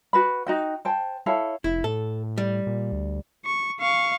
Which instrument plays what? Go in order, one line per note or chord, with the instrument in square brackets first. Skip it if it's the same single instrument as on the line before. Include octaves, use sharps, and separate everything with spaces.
[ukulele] F#4 B4 B5
D#4 F#4 G5
C5 G5 A5
E4 A4 C#5 F5
[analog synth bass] F1 [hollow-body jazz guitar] E4
[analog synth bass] A2 [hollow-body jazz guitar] A4
[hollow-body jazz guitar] G3
[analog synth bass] A#2
D2
[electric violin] C#6
F5 C#6